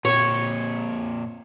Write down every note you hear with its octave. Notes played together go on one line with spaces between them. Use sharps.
A#2 C4 C#5